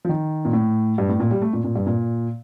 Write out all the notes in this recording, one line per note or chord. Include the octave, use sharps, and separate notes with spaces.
F3
D#3
A#2
A2
G2
A2
A#2
G3
A3
A#2
A#2
G2
A#2